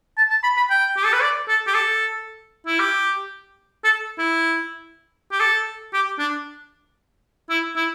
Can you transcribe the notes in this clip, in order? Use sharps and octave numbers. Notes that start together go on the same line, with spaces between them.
A5
A5
B5
B5
G5
G4
A4
B4
D5
A4
G4
A4
E4
G4
A4
E4
G4
A4
G4
D4
E4
E4